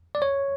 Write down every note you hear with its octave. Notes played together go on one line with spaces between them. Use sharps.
D5
C#5